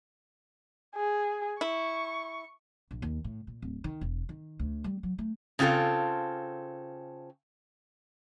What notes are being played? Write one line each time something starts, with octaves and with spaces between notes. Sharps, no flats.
G#4
E4 C#6
A#1
D#2
A2
A#2
D1
D#3
E1
D#3
D2
G3
F#3
A3
C#3 C4 F4 G#4 A4